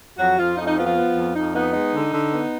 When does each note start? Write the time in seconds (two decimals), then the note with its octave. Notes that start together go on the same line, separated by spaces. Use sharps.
0.18 F2 F#3 F#4
0.38 F2 F3 F4
0.57 F2 D#4
0.67 D#4
0.76 F3 B3 F4
0.87 F3 F4
0.96 B3
1.15 F2
1.35 F2 D#4
1.55 B3 D#4
1.73 G#3 D#4
1.94 D3
2.13 D3
2.32 B3